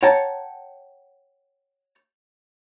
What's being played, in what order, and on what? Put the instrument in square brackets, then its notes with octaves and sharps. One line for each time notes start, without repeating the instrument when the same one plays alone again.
[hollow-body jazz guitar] C#5 F#5 G5 A5 A#5